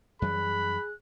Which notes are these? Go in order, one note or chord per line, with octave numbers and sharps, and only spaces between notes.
F#2 E3 G3 G#4 B5 F#6